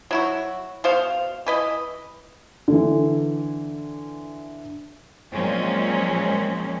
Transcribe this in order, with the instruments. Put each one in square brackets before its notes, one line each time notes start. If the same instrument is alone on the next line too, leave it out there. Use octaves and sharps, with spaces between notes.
[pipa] F#3 E4 F#4
B2 C5 F5
E3 B4 D#5
[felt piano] D3 E3
[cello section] A#2 F3 F#3 G#3 C4 C#4